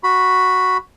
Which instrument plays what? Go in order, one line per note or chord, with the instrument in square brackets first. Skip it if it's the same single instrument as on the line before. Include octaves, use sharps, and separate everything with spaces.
[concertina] F#4 B5